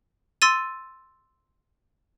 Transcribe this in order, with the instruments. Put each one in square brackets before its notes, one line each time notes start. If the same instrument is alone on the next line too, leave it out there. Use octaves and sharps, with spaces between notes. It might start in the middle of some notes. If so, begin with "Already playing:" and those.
[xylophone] C6 E6 A6 D#7